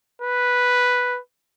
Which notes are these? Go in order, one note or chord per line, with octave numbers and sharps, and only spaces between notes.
B4